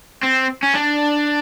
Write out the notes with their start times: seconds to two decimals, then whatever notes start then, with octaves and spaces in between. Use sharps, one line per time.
0.23 C4
0.63 C#4
0.75 D4